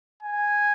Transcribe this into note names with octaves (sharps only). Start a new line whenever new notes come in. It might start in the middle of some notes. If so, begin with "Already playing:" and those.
G#5